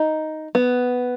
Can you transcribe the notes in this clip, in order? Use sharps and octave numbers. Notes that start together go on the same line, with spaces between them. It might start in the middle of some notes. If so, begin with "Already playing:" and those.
Already playing: D#4
B3